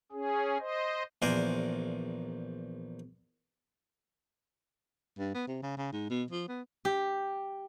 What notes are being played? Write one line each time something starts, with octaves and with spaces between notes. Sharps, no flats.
C#4 G#4
C5 D#5
A#1 E2 A#4 C5 D5 G#5
G2
B3
C3
C#3
C#3
G#2
B2
F3
B3
G4